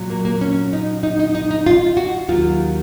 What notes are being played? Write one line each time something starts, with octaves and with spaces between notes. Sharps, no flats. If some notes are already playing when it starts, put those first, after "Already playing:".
Already playing: A#2 F#3
A#3
A#3
C#4
D#4
D#4
D#4
D#4
D#4
F4
F#4
D#2 D#3 F#3 F4